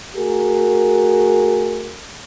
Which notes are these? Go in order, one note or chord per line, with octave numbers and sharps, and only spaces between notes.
A3 F#4 G#4 A#4